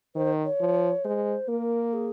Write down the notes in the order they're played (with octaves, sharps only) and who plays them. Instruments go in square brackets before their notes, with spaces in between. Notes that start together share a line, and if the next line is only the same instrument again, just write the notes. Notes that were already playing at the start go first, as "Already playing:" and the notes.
[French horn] D#3 [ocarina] C5
[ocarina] C#5
[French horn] F3
[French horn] G#3 [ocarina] C5
[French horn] A#3 [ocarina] A#4
[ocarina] G#4